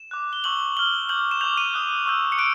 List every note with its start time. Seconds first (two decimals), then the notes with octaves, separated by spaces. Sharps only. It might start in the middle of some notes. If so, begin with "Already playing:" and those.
Already playing: E7
0.11 D6 F#6
0.33 G7
0.44 C#6 E6 G6 F#7
0.77 D6 F6 G7
1.09 D6 G6 F#7
1.31 E7
1.41 D6 G6 F7
1.57 D#7
1.74 D#6 F#6
2.06 C#6 E6 G6
2.32 C#7
2.38 F#6 D7